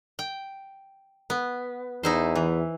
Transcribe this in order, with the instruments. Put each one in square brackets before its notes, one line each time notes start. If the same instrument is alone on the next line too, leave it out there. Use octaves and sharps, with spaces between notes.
[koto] G5
B3
[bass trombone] E2 [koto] D#4 E4 C5
[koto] E3